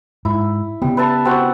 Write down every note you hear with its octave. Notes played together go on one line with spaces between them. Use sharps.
G#2 E4
C#3 G3 B3
B4 E5 A5
C4 F#4 F#5